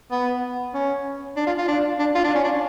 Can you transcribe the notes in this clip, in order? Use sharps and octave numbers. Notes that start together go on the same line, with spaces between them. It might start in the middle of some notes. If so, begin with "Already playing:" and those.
B3
C#4
D4
F4
F4
D4
D4
F4
D4
C#4
D4